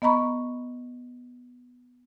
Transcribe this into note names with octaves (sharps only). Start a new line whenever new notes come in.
B3 D#5 A#5 B5 C#6